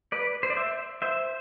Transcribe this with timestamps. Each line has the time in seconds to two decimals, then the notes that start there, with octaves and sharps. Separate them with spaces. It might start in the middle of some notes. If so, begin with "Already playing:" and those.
0.12 B4 D5
0.43 C5
0.50 D5
0.57 C5 E5
1.02 C5 E5